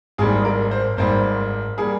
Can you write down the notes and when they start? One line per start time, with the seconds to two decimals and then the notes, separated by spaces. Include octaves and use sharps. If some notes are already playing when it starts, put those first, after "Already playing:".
0.18 G#1 G#2 G3 A#3 G#4
0.45 A#4
0.71 C5
0.97 G#1 G#2 G3 A#3 C5
1.78 G3 A#3 G#4